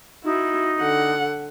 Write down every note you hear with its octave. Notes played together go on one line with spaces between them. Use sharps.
D#4 E4 F#4
D3 F#5